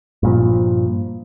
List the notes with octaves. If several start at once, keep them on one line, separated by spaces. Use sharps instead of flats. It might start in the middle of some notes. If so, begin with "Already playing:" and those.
G2 A#2 F3